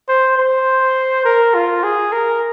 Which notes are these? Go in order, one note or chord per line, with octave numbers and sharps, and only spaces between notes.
C5
C5
A#4
F4
G#4
A#4